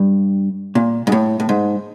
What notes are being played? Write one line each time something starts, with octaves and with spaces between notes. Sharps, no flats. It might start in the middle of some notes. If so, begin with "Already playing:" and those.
Already playing: G2
A#2
G#2
A2
A2
G#2